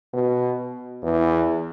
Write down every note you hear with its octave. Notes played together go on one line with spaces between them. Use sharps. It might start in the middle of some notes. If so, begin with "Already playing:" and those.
B2
E2